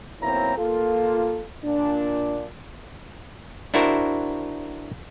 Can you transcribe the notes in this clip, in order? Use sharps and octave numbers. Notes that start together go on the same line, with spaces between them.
B1 A#3 C4 E4 C#5 A#5
A#3 F4 A4
A#2 D4
D4 E4 F#4 A#4 C5